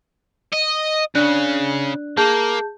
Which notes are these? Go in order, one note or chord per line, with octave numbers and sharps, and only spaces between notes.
D#5
C#3 D4 D5 F#6
A#3 G#4 A5 G6